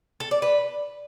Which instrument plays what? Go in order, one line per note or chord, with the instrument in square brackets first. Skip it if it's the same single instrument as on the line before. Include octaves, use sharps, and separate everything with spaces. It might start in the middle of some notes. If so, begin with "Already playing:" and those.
[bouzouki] A4
D5
B4